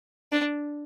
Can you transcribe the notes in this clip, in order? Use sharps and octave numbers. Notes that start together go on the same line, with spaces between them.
D4